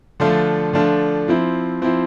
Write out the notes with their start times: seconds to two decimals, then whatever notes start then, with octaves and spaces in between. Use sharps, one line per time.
0.20 D3 F3 A3 D4 F4
0.73 D3 F3 A3 D4 F4
1.28 F3 C4 E4
1.82 F3 C4 E4